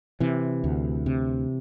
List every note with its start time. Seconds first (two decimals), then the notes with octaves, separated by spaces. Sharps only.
0.20 C3 E3
0.64 D2
1.06 C3